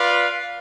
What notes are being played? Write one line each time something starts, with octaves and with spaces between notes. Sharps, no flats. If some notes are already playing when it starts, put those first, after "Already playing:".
Already playing: F4 B4 D5 F5